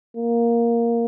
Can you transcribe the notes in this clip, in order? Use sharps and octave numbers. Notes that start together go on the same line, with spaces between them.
A#3